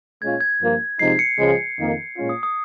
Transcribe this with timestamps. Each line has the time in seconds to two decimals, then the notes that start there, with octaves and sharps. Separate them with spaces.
0.22 A#2 G#3 C#4 F4 G#6
0.41 G#6
0.61 G2 F3 A#3 F4
0.99 C3 F3 G#3 D#4 C7
1.19 C#7
1.39 C#2 C#3 F3 G#3
1.78 F2 D#3 A#3 D#4
2.17 A#2 G#3 C#4 F4
2.29 D#6
2.43 D#6